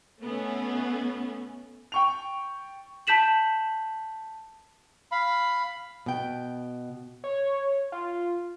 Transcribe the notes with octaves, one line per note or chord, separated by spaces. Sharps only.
B2 A3 B3 C#4
G5 C#6 F7
A5 G6 B6 E7 F#7
F5 B5
B2 G5
C#5
F4